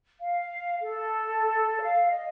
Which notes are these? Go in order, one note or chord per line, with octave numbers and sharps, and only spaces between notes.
F5
A4
F5
D#5